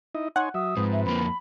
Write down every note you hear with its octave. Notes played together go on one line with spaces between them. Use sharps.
D#4 E4 D#5
D#4 C#5 F#5 G#5 C6
F#3 E5 D#6
G#2 F3 C4 B4
E5
F2 A#3 B5